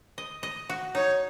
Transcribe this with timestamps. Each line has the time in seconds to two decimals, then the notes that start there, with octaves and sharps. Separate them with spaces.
0.18 D#5
0.43 D#5
0.70 F#4
0.95 D#4 C#5